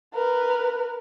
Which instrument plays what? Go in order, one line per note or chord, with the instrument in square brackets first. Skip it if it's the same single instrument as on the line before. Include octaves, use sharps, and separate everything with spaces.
[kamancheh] A#4 B4